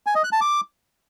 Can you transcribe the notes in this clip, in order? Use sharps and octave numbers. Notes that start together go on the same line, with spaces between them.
G#5
D#5
F#6
A5
D6